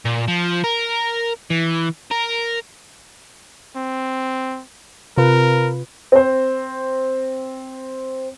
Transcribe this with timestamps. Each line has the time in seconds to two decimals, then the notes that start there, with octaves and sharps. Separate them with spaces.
0.05 A#2
0.28 F3
0.64 A#4
1.50 E3
2.11 A#4
3.77 C4
5.18 C3 F4 A#4 B4
6.12 C4 C5